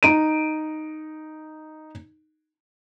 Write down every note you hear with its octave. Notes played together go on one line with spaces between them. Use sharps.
D#4 D7 D#7